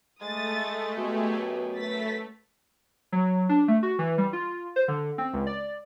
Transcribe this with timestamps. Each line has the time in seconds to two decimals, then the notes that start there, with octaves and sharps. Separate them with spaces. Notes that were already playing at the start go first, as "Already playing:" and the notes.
0.21 G#3 A3 D#6 A6
0.97 B2 G4 G#4 B4
1.29 F#2
1.76 A3 B4 A6 B6
3.12 F#3
3.49 D4
3.68 A3
3.83 F#4
3.99 E3
4.18 G3
4.33 F4
4.76 C5
4.88 D3
5.18 C4
5.33 C#2
5.47 D5